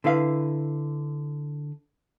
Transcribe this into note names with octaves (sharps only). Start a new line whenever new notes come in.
D3 E4 B4 F5